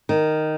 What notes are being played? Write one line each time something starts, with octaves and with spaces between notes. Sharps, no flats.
D#3